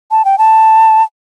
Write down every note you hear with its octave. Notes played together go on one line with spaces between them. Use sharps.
A5
G5
A5